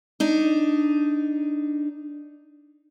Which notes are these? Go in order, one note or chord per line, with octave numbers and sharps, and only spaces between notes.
D4 D#4